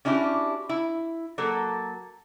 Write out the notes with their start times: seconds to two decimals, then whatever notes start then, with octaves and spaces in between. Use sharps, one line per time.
0.05 C#4 D4 E4 F#4 G4
0.69 E4
1.38 F#3 A#3 A4